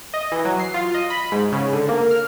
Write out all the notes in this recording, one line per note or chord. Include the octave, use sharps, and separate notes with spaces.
D#5
E3
F#3
C7
F4
D#5
B5
G#2
C#3
D3
A#3
F6